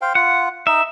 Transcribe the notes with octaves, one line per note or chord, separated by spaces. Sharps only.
C5 F5 G5
F4 F#5
D#4 D#5 E5